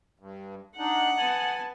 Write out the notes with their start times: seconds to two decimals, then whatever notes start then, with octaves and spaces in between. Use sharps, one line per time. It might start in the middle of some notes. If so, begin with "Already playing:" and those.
0.20 G2
0.78 D4 D#4 F#5
1.18 B3 G#5 A5